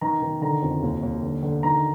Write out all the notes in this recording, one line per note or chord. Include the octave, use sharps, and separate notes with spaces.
D#3 A#5
D#3
D3 A#5
F2
D#2
D#2
D3
D3
D#3 A#5